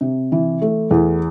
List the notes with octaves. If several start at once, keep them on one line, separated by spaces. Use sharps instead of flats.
C3
E3
A3
E2